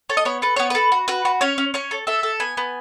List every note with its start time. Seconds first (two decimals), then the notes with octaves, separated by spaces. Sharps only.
0.09 A4 C#5
0.17 D#5
0.25 B3 C#5
0.42 A4 B4
0.56 B3 C#5
0.70 A4 B4
0.92 F#4
1.08 F#4 B4
1.25 F#4
1.41 C#4 C#5
1.58 C#4
1.74 C#4 C#5
1.91 A4
2.07 A4 E5
2.23 A4
2.40 B3 G#5
2.57 B3